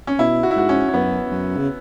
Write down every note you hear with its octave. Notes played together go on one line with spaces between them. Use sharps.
C#4
B2 E4
F#4
E4
G#2 F#4
C#4
C#4
F#2 B3
F#2
C#3